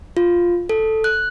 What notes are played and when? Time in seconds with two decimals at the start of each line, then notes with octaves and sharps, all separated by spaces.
0.17 F4
0.69 A4
1.04 F#6